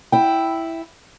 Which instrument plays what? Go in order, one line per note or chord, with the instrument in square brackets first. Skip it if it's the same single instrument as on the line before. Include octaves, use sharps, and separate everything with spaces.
[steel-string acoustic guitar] E4 G5